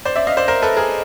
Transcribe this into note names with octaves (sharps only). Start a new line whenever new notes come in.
C5 D5
D5 E5
D#5 F5
C5 D5
A#4 C5
A4 B4
G#4 A#4